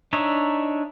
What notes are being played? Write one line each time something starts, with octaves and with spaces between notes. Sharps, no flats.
D4 D#4 C#5 E5